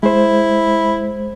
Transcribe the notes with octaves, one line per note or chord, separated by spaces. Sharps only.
G#3 E4 C5